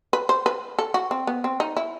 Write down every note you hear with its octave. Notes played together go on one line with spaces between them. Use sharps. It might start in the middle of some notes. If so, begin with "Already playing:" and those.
B4
C5
B4
A4
F#4
C4
B3
C4
D#4
E4